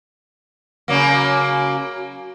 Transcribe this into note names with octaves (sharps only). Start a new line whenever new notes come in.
C#3 F#3 A#3